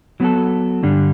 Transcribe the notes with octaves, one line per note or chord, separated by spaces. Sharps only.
F#3 B3 F#4 A4
G2 D3 G3 D4